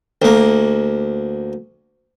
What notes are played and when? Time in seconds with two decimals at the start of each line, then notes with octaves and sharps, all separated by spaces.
0.22 D2 A#3